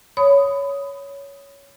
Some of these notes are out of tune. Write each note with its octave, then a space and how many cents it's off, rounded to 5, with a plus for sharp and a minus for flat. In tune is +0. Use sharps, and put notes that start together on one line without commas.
C#5 +10 B5 +20 D#6 +0